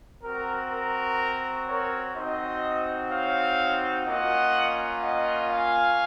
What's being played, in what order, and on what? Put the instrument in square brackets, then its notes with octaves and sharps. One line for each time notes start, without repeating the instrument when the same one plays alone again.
[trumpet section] C4 F#4 A#4
A#4
A#4 C#5
C4 D#4 F#4 C5 D#5
C#5 F5
A#3 C#4 F4 D#5 F#5
D#5 F#5
F5 G#5